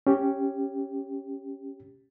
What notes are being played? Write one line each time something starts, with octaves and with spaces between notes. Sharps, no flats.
C#4 G4